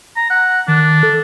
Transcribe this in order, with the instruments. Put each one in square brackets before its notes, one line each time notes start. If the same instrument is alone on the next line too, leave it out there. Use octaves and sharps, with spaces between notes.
[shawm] A#5
F#5
[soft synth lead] D#3 [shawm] D4
[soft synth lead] A4